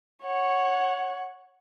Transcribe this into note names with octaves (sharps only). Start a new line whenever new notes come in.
C#5 F#5